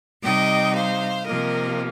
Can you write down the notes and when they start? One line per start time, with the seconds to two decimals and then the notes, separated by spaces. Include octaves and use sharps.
0.23 C3 G3 D#4 D#5 G5
0.74 C5 F5
1.25 C3 F3 A#3 A#4 D#5